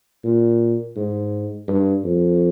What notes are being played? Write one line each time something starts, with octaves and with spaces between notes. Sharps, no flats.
A#2
G#2
G2
F2